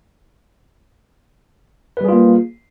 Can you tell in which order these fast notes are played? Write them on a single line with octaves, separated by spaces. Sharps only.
B4 G3 G#4 F4 A#3